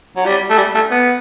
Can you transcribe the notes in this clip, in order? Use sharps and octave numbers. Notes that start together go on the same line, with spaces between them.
F#3
G3
A3
G3
A3
B3